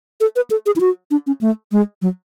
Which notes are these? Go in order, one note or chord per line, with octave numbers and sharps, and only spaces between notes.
A4
B4
A4
G#4
E4
F#4
D4
C#4
A3
G#3
F#3